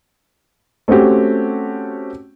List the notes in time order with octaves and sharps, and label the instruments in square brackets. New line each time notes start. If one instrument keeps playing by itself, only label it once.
[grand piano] A3 C4 C#4 F#4 G4